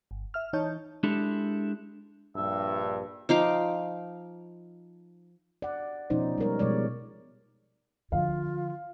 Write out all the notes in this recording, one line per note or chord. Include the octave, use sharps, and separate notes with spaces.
G1
E5 F6
E3 D#4 C#5 A5 G6
G#3 D4 E4 G4 A4
A#1 G2 E5
F3 D#4 F5 D6
D5 F#5
B2 F3 C#4 D#4 C5 D5
G3 G#3 A#4 C#5
B2 F3 G3 G#3 C#5 D5
D3 F3 F4 F5